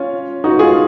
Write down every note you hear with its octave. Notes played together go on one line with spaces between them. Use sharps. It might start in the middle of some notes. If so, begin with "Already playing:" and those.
Already playing: C#4 F4
D#4 F#4
F4 G#4